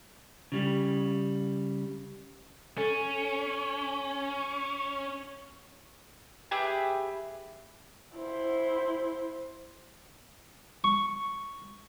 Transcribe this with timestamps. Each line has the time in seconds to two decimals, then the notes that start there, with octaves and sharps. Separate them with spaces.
0.52 C#3 G3
2.78 C#4 A4
6.51 G4 G#4 B4 E5
8.17 E4 C5
10.84 C#6